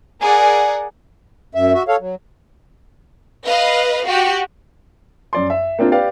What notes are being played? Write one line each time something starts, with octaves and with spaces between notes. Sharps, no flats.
G#4 A#4 D5 F#5
F#2 E5
F#4 E5
A4 C#5 F5
F#3
B4 D#5 F5
F#4 G4
F#2 D5 C6
E5
A#3 C4 D4 F4
G4 B4 D5 F5